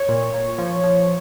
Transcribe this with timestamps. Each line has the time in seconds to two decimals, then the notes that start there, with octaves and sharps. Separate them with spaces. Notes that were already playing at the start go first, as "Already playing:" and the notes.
Already playing: C#5
0.08 A#2
0.33 A#2
0.58 F3
0.84 F3